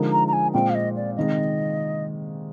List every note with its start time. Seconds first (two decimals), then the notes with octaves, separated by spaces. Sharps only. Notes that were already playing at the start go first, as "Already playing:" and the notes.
Already playing: D3 F3 G#3 D#4 A#4
0.12 A#5
0.28 A#5
0.33 G#5
0.54 A#2 G#3 C4 G5
0.70 F5
0.75 D#5
0.96 D5
1.16 C3 D#3 G#3 D#5